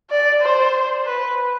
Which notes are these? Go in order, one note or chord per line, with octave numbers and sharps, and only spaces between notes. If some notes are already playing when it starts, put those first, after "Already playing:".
D5
C5
B4